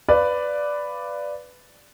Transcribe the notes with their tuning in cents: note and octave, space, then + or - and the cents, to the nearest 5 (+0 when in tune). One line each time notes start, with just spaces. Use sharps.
B4 +10 D5 +0 F5 -25